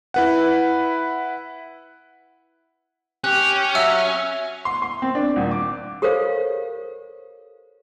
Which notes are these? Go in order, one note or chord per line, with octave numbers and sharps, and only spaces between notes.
E4 B4 F#5
C#4 G4 F#6
F#3 E5 E6 C#7
C6
C6
C4
D4
D#1
D6
G4 A4 A#4 C5 C#5 F5